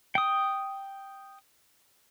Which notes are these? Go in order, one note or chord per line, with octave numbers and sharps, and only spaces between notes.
G5 D#6